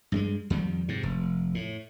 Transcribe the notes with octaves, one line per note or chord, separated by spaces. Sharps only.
G2 G3 G#3
F2 D#3 G3
G#2 C3
F1
A2